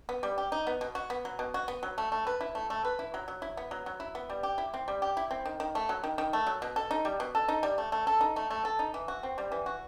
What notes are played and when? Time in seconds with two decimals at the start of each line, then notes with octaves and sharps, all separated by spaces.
0.09 B3
0.23 G3
0.38 G4
0.52 D#4
0.67 B3
0.81 B2
0.95 F#4
1.10 B3
1.25 F#3
1.39 B2
1.54 F#4
1.68 B3
1.83 F#3
1.98 A3
2.12 A3
2.27 B4
2.41 E4
2.55 A3
2.70 A3
2.85 B4
2.99 E4
3.14 F#3
3.28 F#3
3.42 E4
3.57 B3
3.71 F#3
3.86 F#3
4.00 E4
4.15 B3
4.30 G3
4.43 G4
4.58 E4
4.74 C4
4.88 G3
5.02 G4
5.17 E4
5.31 C4
5.45 D#3
5.60 D#3
5.75 A3
5.89 F#3
6.04 D#3
6.18 D#3
6.33 A3
6.47 F#3
6.62 B2
6.76 A4
6.91 D#4
7.05 G3
7.20 B2
7.35 A4
7.48 D#4
7.63 G3
7.78 A3
7.92 A3
8.07 A4
8.21 D#4
8.36 A3
8.50 A3
8.65 A4
8.79 D#4
8.94 E3
9.08 F#4
9.23 C4
9.38 G3
9.52 E3
9.66 F#4